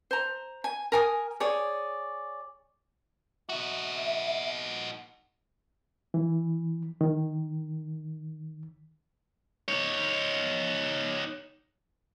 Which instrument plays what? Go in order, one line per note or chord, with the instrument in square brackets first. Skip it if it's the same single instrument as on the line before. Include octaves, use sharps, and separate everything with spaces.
[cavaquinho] C5 A#5
G#5
A#4 G#5 D#6
G#4 C#5 D5
[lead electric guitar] D#4 F#4 [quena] E5
[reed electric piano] E3
D#3
[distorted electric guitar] D#4 C#5